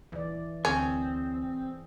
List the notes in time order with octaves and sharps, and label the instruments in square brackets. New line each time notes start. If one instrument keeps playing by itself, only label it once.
[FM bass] D#1 [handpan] E3 D5
[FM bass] D2 [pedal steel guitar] C4 [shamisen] C#4 [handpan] G#4